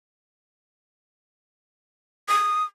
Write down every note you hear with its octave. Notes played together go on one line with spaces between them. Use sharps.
D#6